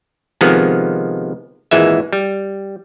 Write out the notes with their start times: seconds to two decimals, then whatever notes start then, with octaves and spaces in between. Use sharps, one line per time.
0.41 C3 D#3 F3 G#3 B3
1.71 G#1 A#2 E3 G#3 E5
2.13 G3